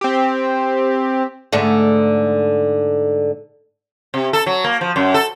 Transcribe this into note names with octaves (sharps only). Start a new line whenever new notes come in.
C4 G4
G#2 D3 A3
C3
A4
F#3
A#3
F3
F#2
A4